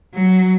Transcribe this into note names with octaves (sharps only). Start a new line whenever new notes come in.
F#3